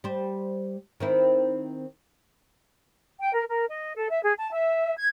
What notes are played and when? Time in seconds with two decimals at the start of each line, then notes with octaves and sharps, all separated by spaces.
0.04 G3 C5
1.00 D#3 C4 E4
3.19 G5
3.34 A#4
3.48 A#4
3.69 D#5
3.96 A4
4.10 E5
4.23 G#4
4.38 A5
4.52 E5
4.97 G#6